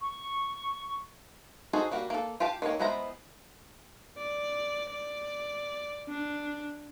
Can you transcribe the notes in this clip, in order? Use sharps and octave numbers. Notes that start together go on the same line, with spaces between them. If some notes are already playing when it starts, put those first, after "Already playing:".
C#6
D#4 F#4 G#4 A4 C5
G3 A#3 F#4
A#3 A4
F4 G4 F5 A5
D#3 A#3 A4 C#5
G#3 B3 E4 C5 A#5
D5
D5
D4